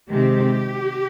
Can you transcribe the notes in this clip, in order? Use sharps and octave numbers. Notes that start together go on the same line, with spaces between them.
C3 D#3 G#3 C4 G4